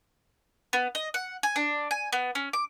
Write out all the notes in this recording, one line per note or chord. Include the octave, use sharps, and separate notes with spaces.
B3
D#5
F#5
G#5
D4
G#5
B3
C#4
D6